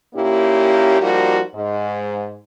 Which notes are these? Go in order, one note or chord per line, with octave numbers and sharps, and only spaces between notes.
A#2 A#3 C#4 E4 G4
F3 G3 A#3 D#4 F4 F#4
G#2